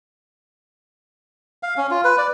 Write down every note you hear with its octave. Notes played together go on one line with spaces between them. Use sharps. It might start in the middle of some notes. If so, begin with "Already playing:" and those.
F5
C#4
F4
B4
D5